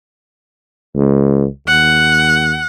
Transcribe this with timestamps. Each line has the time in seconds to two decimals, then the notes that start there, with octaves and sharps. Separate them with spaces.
0.95 C#2
1.67 D#2 F#5